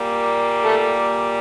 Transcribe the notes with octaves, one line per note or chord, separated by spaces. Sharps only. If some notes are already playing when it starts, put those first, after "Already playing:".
Already playing: A#2 G3 A#3
A3 A4